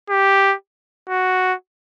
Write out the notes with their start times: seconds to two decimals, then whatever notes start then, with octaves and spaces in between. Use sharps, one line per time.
0.10 G4
1.09 F#4